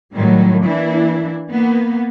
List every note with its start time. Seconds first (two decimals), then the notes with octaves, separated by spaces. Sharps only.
0.15 A2 D#3 F#3 G3
0.66 E3 A#3 D4 E4
1.51 A#3 B3